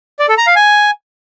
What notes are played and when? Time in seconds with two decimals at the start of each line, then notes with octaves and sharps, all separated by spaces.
0.19 D5
0.28 A4
0.38 A#5
0.47 F5
0.56 G#5